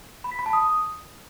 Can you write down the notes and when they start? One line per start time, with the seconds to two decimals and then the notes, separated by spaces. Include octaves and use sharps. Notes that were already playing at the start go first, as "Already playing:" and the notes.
0.24 B5
0.32 B6
0.39 B5
0.46 A5
0.53 D#6